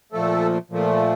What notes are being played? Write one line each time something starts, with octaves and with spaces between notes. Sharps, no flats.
A#2 F3 A3 A4
A#2 F3 A3